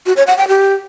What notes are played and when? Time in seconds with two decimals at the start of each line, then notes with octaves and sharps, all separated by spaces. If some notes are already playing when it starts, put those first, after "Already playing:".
0.06 F#4
0.17 C#5
0.27 F#5
0.37 G5
0.48 G4